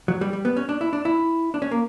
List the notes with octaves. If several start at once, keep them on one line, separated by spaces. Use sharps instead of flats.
F#3
G3
G3
B3
C#4
D4
E4
D4
E4
D4
C#4
A#3